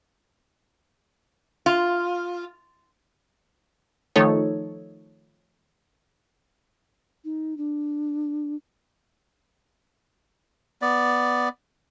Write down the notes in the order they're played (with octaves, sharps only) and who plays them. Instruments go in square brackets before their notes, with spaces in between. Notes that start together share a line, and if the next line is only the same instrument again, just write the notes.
[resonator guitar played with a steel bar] F4
[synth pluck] D#3 F3 A3 D#4 A4 C#5
[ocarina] D#4
D4
[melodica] B3 D5